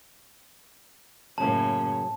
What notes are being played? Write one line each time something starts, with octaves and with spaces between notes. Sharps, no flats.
F#2 A2 C#3 A#3 C#4 A5